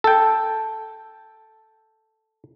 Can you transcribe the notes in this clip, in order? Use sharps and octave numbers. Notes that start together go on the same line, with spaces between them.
A4 G5